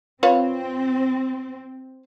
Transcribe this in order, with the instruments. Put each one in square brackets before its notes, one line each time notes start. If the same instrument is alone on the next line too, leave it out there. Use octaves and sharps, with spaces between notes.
[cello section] C4 [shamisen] F4 B4 C#5